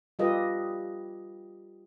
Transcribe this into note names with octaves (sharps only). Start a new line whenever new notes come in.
G3 F4 G4 A4 B4 D#5